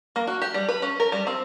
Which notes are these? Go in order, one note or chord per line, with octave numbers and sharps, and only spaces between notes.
A#3
F#4
G4
G3
B4
C#4
A#4
G3
C4